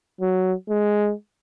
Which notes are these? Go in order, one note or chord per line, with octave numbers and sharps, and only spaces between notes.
F#3
G#3